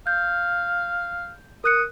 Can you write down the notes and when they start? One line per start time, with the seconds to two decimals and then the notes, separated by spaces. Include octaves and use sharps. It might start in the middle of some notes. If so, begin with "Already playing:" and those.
0.07 F5 G6
1.64 A#4 D#6 F#6 C#7